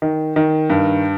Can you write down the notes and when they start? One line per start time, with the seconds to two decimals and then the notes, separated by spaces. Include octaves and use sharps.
0.02 D#3
0.36 D#3
0.70 G2